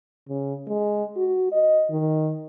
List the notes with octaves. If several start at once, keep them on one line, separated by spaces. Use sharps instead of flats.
C#3
G#3
F#4
D#5
D#3